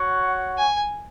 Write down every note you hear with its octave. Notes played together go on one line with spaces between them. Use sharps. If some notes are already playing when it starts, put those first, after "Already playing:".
Already playing: F#4 C#5 F#5
G#5